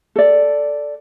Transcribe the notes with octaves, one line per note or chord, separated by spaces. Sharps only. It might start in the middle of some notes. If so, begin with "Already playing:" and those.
A4 D5